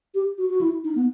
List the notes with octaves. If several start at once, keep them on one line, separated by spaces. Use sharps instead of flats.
G4
F#4
F#4
E4
D#4
B3